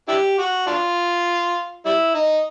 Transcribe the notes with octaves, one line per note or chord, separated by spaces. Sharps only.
D4 E4 G4
F#4
D4 F4
G3 E4
D#4